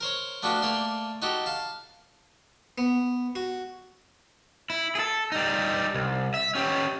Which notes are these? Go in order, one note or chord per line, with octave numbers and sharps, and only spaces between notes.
A#4 C5 C#5
A3 B3 D4 F#4 G4 F5
A3 A#3 D5 G5 C6
D#4 F#4 G4 A4
F5 A5
B3
F#4
E4
G#4 A4
G3 D#4
C2
E5
C#4 G4